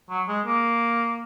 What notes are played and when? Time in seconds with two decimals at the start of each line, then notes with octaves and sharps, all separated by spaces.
0.10 F#3
0.29 G#3
0.46 A#3